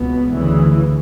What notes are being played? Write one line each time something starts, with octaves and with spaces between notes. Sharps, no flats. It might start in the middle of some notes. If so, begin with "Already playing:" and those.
Already playing: C#2 B2 B3
D2 C#3 E3